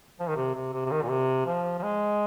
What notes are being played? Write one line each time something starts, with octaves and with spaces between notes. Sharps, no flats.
F3
D#3
C3
C3
C3
C3
D#3
A#2
C3
F3
F3
G#3